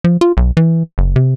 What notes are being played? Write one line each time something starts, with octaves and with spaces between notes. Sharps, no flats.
F3
F4
B1
E3
F#1
C3